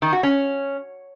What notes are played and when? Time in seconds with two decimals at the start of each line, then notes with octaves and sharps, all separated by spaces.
0.02 D#3
0.13 F#4
0.23 C#4